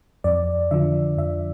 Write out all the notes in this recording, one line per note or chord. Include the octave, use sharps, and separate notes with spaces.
F2 D5
D3 F3 E5
F2 E5